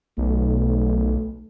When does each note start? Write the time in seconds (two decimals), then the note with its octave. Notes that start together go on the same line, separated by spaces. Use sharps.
0.18 B1 A3